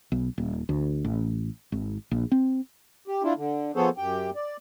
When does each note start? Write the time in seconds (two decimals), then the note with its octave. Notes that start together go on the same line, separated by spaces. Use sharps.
0.12 B1
0.38 D#1
0.69 D2
1.05 A1
1.72 G#1
2.11 A#1
2.32 C4
3.08 G4
3.23 D4 E4 F4
3.37 D3
3.76 F3 B3 G#4 A4 C5 C#5
3.98 F#2 G4 G5
4.35 D5